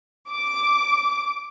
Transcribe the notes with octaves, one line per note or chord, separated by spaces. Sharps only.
D6